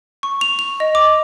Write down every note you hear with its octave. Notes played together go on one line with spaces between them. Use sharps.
C#6
F7
F7
D#5
D6